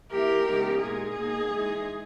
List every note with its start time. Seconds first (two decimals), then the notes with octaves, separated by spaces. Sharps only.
0.11 E3 A#3 E4 G4 A#4
0.45 C#3 E3 G#3 B3 D#4
0.81 A#2 G#3 D#4 G#4
1.17 B2 A#3 D#4
1.52 E3 G#3 D#4